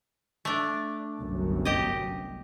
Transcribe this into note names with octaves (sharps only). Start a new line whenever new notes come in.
A3 D4
G1 C2 F#2
G4 D#5